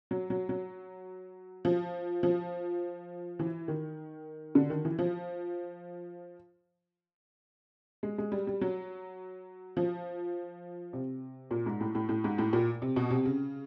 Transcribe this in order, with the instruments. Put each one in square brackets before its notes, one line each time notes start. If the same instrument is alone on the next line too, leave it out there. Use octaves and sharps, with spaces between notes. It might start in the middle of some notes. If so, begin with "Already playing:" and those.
[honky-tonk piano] F#3
F#3
F#3
F3
F3
E3
D#3
D3
D#3
E3
F3
G#3
G#3
G3
G3
F#3
F3
C3
A#2
G#2
A2
A2
A2
G#2
A2
A#2
C3
B2
C3
C#3